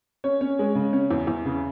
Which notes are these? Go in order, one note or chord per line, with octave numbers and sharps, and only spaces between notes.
C#4 C#5
C#4
G#3
C#3
C#4
E2
E2
C#3